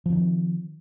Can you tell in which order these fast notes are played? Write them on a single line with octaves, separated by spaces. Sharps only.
F3 C4 D#3